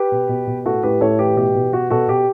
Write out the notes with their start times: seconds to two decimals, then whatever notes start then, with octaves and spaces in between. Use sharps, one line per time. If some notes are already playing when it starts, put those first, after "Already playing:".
Already playing: G4 B4
0.12 B2
0.29 B2
0.47 B2
0.66 A2 F#4 A4
0.83 A2 G4 B4
1.01 A2 A4 C#5
1.19 E3 G4 B4
1.37 B2 G4
1.55 B2
1.72 B2 F#4
1.90 B2 F#4 A4
2.08 B2 G4